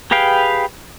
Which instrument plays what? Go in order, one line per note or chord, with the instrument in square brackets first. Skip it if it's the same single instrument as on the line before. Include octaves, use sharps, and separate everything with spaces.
[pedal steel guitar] G4 G#4 B4 F5 G5